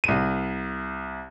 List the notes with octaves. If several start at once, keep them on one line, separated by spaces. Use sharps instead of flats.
C2 D#7